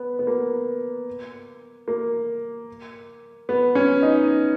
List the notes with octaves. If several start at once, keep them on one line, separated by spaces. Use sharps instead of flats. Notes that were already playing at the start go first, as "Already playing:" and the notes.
Already playing: B3
B3
A#3
A#3
B3
C#4
D#4